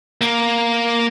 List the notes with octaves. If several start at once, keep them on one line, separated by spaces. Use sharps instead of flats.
A#3